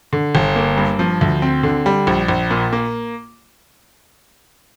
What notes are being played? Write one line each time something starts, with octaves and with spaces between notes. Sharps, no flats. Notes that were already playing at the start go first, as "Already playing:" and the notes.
D3
G1
A#3
G2
F3
D2
C4
D3
G3
A#1
A#1
A#2
A#3